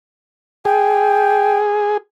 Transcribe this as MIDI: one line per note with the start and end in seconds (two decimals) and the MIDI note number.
0.65 1.97 68
0.65 1.58 79